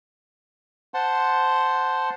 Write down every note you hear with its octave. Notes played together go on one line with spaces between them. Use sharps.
C5 F#5 A5 C6